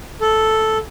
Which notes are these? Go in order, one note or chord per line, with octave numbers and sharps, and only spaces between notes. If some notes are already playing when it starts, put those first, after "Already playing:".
A4